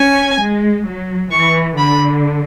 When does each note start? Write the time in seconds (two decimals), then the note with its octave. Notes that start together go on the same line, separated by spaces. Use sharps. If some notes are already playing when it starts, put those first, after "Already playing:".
Already playing: C#4 G#5
0.40 G#3
0.86 F#3
1.31 E3 C#6
1.78 D3 B5